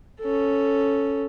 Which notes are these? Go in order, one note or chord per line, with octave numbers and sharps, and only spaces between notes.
C#4 A4